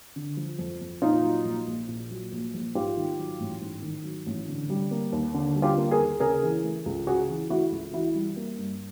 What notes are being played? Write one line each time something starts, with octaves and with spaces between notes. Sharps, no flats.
D3
F3
F2
F2
A#2 D#4 F4
F#3
A#1
A#1
A#2
F#3
A#1
A#1
G#2 F4 G4
D#3
F#3
A1
G#2
D#3
F#3
A1
D3
G3
A#3
D#2
D3
G3
F4 G4
A#3
G#4 A#4
D#2
C#3 G#4 A#4
E3
A3
C#2
C#3 F#4 G#4
E3
A3 E4 F#4
C#2
E3 E4 F#4
G3
A#3
G2